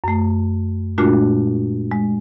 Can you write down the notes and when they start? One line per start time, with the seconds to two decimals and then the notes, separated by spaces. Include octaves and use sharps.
0.04 F#2 A3
0.98 A#2 G#3 A3 D4 F4 F#4
1.92 G#3